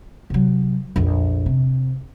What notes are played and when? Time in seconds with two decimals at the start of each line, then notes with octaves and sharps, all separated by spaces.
0.30 C3 F#3
0.96 A#1 F2
1.46 C3